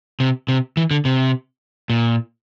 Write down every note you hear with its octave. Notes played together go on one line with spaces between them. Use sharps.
C3
C3
E3
D3
C3
A#2